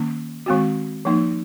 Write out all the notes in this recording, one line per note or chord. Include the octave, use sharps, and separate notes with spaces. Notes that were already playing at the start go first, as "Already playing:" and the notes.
Already playing: D#3 A#3 C#4
D#3 G#3 C4 F#4
F3 A#3 D#4